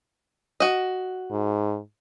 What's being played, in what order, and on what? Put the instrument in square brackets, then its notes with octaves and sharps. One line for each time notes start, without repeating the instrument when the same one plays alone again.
[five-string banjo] F#4 D#5
[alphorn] G#2